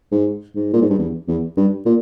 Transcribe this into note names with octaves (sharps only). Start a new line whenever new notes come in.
G#2
G#2
A#2
G#2
G2
E2
E2
G2
A#2